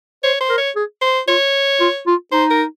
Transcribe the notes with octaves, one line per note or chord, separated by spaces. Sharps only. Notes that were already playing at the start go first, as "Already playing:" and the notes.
C5 C#5
C5
A#4
C#5
G#4
C5
F4 C#5
F4
F4
D#4 C5
A#4